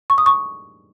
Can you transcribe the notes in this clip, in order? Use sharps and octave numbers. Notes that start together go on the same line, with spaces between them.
C#6
D#6
C#6